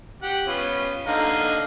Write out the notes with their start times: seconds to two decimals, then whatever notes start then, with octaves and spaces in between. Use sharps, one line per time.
0.22 G4 F#5
0.47 B3 C#4 F4
1.07 D3 D#4 F5